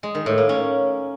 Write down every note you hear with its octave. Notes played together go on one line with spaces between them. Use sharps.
G#3
D#3
A2
A#3
C#4